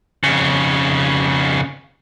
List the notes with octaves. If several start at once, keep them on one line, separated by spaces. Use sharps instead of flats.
F2 C#3